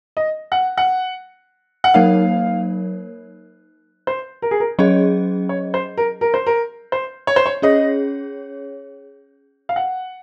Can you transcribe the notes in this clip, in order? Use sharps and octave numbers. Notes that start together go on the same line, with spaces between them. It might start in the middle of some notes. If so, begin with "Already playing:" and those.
D#5
F#5
F#5
F#5
F#3 A#3 D#4 A#4 C#5 F5
C5
A#4
G#4
A#4
F#3 C#4 G#4 C#5 D#5
C#5
C5
A#4
A#4
C5
A#4
C5
C#5
C5
C#5
C#4 G#4 C#5 D#5
F5
F#5